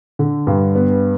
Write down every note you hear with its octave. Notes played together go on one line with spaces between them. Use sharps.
D3
G2
B3